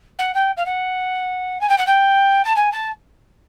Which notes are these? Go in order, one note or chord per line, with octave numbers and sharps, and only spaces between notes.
F#5
G5
F5
F#5
G#5
G5
F#5
G5
A5
G#5
A5